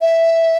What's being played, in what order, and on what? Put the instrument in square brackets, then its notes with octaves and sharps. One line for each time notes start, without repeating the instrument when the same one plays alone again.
[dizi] E5